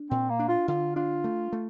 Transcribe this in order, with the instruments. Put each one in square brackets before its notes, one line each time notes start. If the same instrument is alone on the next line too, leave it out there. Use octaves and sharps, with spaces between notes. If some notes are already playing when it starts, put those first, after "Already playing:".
Already playing: [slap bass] D4
[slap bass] A#2 [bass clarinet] C4
[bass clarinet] A#3
[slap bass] D4
[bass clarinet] F4
[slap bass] D3 [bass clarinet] F4
[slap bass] D4 [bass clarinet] F4
[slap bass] A3
A3